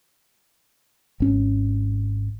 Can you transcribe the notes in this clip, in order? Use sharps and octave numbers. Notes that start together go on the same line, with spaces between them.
G#1 C#4